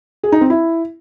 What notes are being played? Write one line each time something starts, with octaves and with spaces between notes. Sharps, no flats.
G#4
D#4
C4
E4